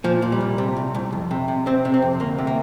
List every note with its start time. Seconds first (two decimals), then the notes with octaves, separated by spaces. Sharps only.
0.04 A#2 F3
0.22 A#2
0.32 G3
0.41 C2
0.58 C3
0.77 C2
0.95 C2
1.12 F2
1.31 C3
1.48 C3
1.66 C3 C4
1.85 C3
1.94 C4
2.02 F2
2.20 D2 A#3
2.38 C3
2.47 A#3